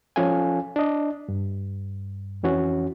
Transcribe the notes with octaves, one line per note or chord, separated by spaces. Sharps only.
F3 C#4 F4 A4 F5 G#5
D4 D#5
G2
F2 E3 C#4 F#4